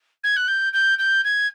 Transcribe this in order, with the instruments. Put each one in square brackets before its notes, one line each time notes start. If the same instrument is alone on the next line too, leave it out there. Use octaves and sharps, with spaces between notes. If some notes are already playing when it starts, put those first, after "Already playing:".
[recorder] G#6
F#6
G6
G6
G6
G#6